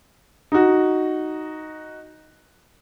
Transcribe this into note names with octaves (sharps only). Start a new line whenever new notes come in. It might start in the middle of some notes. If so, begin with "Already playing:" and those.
D#4 F#4